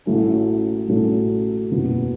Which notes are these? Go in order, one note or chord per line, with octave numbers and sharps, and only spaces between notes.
A1 A2 F#3 A3 C#4
A1 A2 F#3 A3 C#4
F#1 E2 B2 F#3 B3